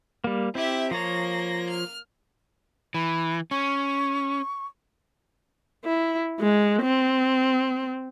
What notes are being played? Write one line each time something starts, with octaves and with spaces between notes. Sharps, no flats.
G3 A#3
C4 E4 G4 E5
F3 A#3 C#5 A#6
F6
E3 B5
C#4 C#6
E4
G#3
C4